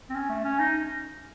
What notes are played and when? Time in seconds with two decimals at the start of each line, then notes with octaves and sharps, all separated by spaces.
0.10 C4
0.15 C#4
0.29 A3
0.44 C#4
0.59 D#4